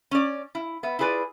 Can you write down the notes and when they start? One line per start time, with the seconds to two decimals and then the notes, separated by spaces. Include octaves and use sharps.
0.11 C#4 D5
0.55 E4
0.83 B3 E5
0.99 E4 F4 G#4 B4 D5